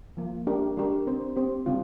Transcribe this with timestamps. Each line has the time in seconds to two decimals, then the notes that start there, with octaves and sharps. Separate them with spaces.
0.17 F3 A#3 F4
0.47 G#3 D4 G4 A#4
0.77 G#3 D4 G4 A#4
1.07 C4 G4 C5
1.36 C4 G4 C5
1.66 D3 G3 C4 F4